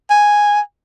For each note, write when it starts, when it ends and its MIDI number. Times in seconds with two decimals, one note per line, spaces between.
0.10 0.60 80